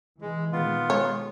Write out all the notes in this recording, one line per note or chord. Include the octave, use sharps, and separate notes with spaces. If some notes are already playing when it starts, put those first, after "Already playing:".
E3 G#3
A#2 D#3 G#3 B3 F4
B2 G#3 C#5